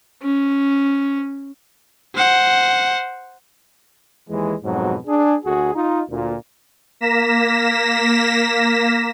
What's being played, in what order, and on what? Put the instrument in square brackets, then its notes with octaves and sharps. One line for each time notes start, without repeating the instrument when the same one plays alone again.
[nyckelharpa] C#4
[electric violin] C5 F#5
[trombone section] D#2 E3 G#3
F2 G#2 B2 F#3
D4 G#4
D2 F#4 G#4
D#4 F4
D2 A#2
[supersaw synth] A#3 A#6 B6 E7